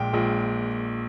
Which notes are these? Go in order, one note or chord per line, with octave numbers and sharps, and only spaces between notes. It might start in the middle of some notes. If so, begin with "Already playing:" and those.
Already playing: A#1 A#2 G#3 G5
A#1 A#2 G#3